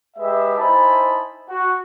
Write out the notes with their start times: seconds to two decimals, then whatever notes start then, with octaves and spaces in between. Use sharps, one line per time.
0.17 G#3 G4 B4 E5
0.57 D#4 E4 C5 G#5 A5 B5
1.48 F#4